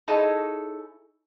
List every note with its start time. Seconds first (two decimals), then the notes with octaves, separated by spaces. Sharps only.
0.08 D#4 E4 G#4 A4 C#5 D#5